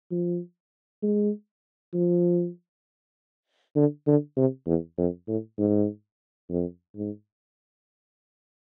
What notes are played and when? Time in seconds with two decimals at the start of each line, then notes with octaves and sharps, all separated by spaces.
0.11 F3
1.02 G#3
1.94 F3
3.76 D3
4.07 D3
4.37 C3
4.67 E2
4.98 F2
5.28 A2
5.58 G#2
6.50 F2
6.95 G#2